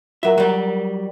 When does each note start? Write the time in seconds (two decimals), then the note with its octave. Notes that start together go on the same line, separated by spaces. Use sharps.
0.23 F#3 F4 A#4 E5 A#5
0.38 F#3 G3 A#4